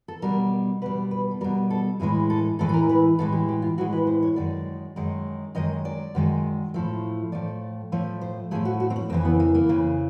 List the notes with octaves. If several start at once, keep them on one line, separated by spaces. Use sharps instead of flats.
A4
B2 G3 A#4
B2 G3 B4
B4
A4
B2 G3 A#4
A4
A2 E3 G#3 G#4
A4
A2 E3 G#3 A4
A4
A#4
B4
A2 E3 G#3 A4
G4
G4
F4
A2 E3 G#3 F#4
B4
C5
C#5
F#2 D#3 G#3 D5
F#2 D#3 G#3
F#2 D#3 G#3 D#5
D5
F#2 D#3 G#3
A2 F3 A3
A2 F3 A3 D5
A2 F3 A3 C#5
C5
A2 F3 A3 G#4
F#4
F#4
C4
C#4
F2 C#3 E3 C4
B3
A#3
A#3
F2 C#3 E3